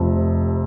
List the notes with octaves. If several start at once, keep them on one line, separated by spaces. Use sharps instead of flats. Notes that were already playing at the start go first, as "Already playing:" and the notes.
Already playing: F1 F2 C3